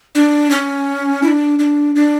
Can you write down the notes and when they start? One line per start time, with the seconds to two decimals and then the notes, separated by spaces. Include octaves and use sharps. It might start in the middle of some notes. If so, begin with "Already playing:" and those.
0.15 D4
0.51 C#4
1.23 E4
1.28 D4
1.59 D4
1.95 D4